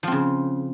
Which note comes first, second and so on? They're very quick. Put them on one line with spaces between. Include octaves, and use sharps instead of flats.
F3 C4 C#3